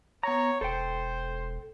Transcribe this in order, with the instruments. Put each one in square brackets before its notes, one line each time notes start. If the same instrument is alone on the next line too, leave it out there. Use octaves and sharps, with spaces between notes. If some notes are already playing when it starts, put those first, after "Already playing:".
[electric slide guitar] B3 A#5 [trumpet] C#5
[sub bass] E1 [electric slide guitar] A4 G5 [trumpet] C5